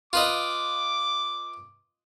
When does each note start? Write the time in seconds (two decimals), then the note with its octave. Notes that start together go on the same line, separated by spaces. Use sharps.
0.13 F4 B4 D#5 D6